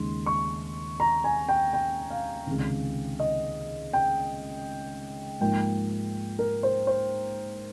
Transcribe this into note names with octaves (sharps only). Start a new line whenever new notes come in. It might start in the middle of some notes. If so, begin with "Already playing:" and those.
Already playing: D#2 C#3 G#3 D#4 C6
C#6
A#5
G#5
G5
G5
F5
C#2 C3 D#3
D#5
G5
G#2 F3 A#3 D#4 G5
A#4
C5
C5